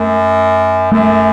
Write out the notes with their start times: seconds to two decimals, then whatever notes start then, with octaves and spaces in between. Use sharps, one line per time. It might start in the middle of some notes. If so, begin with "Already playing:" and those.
Already playing: F#2 A3
0.92 F#2 A3